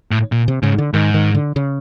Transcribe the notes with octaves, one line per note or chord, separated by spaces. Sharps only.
A2
A#2
C3
G#2 C#3
D3
G#2 D#3
D#3
D3
C#3